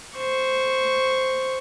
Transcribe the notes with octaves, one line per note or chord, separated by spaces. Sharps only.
C5 C#6